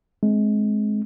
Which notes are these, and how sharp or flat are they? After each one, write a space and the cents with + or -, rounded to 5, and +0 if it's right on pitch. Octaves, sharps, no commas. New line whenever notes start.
G#3 +25 C4 +20